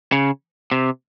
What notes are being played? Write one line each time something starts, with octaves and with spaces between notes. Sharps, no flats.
C#3
C3